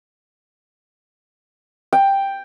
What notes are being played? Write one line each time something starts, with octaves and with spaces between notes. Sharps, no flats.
G5